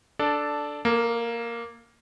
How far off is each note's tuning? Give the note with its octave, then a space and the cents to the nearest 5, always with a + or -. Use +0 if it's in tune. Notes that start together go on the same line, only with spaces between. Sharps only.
D4 +0 A4 -5 D5 +0
A#3 +0 A4 +35